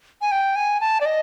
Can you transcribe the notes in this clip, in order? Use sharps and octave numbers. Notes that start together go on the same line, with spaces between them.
G#5
G5
G#5
A5
D5
D#5